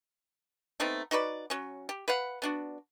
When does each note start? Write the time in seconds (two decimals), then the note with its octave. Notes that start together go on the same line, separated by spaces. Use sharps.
0.80 A3 B3 C4 D#4
1.11 D#4 F#4 B4 D5
1.50 F#3 C#4
1.89 G4
2.08 B4 F5 F#5
2.42 B3 D4 F#4